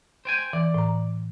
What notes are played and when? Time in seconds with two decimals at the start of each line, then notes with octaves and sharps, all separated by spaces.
0.25 C5 G5 G#5
0.53 E3 D5
0.74 A2 A#5